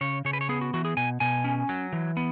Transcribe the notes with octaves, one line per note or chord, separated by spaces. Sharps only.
C#3 C#5
C#3 C#5
B4
C#5
B3 G#4
F#4
E3 F#4
G#4
B2 G#5
B2 G#5
C#4
F#3
E3
B3